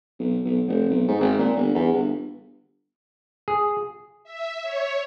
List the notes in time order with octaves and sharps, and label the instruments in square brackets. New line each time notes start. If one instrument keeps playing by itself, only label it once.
[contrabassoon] B1
B1
F1
B1
G#2
G#1
A#2
G1
E2
G1
[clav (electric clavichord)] G#4
[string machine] E5
C#5